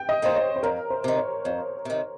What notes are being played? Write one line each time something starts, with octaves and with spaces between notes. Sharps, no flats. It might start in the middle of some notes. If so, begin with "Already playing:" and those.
Already playing: G5
D#5
D#3 A#3 D#4 C5
C#5
C5
F2 A#4
C5
C3 D#3
C#5
F2
C3 D#3